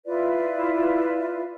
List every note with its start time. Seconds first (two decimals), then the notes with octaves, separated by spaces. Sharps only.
0.06 E4 F4 B4 D5